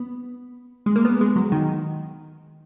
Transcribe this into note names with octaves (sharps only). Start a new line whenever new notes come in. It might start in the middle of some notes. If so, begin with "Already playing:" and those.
Already playing: B3
G#3
A#3
B3
G#3
F#3
D#3